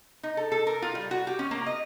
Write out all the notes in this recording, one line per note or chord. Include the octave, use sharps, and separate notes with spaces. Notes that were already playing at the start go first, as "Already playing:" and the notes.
D#4
A4
A4
A#4
F4
G3
F#4
G4
C#4
A#3
D#5